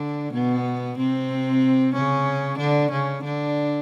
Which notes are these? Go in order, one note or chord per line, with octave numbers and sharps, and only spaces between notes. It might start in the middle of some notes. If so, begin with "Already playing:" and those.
Already playing: D3 D4
B2 B3
C3 C4
C#3 C#4
D3 D4
C#3 C#4
D3 D4